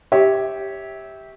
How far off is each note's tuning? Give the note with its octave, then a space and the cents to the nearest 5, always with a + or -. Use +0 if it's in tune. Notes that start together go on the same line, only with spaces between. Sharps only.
G4 +0 C#5 +0 E5 -20